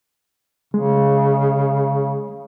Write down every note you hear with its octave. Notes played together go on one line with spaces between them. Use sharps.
C#3 G#3